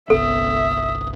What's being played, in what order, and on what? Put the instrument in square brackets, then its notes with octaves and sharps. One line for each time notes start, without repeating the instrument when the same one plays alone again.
[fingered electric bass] G1 C2 B3 [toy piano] A4 [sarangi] E5 [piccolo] D#6